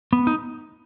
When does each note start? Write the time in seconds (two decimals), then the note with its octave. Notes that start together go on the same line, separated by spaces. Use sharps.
0.13 B3
0.27 D#4